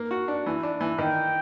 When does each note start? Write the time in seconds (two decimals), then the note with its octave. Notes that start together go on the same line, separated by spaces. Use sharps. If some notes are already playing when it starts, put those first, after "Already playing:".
Already playing: A#3
0.11 F#4
0.28 D4
0.46 E3
0.63 D4
0.81 E3
0.98 D#3 G5